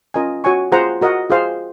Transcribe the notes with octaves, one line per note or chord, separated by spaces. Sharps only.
C#4 F4 A#4 D#5 G#5
F#4 C#5 G#5 C#6
F4 G#4 C5 F#5 A#5
F#4 A#4 D#5 F#5
F4 G#4 C5 F5